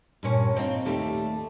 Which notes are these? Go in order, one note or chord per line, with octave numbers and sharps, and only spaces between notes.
G2 A#2 C#4
C4 D#4 F4
D#2 G3 A3